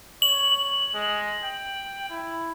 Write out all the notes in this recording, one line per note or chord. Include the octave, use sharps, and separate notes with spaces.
C#5 F#7
G#3
G5
E4